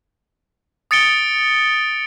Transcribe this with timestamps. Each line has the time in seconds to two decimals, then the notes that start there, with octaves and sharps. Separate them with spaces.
0.91 D#6 A6 C#7 D7 G7